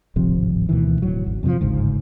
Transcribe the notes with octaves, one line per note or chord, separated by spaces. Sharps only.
D1 G#1 C3 F3
D2 B2 D#3 E3
D1 F#3
G#1
F2 C3 D#3 F3
G1 C#2 G#2